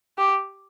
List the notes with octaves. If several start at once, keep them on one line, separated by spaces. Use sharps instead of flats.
G4